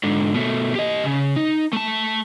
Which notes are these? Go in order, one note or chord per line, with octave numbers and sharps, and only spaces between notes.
G#2 D3
B2 A3
G4 D#5
C#3
D#4
A3 A5